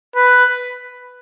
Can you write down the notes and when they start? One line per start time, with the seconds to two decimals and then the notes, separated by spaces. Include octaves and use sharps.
0.16 B4